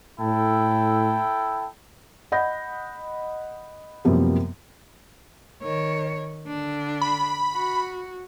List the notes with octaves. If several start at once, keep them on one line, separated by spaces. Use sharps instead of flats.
A2 E4 A4 G5
D#5 F#5 B5 G6 A#6
F#2 C3 F3 G3 A#3 B3
D#3 C#5
D3 D4
B5
F#4